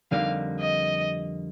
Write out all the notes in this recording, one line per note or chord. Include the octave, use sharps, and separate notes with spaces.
F2 D3 G3 A#3 D#4 F5
D#5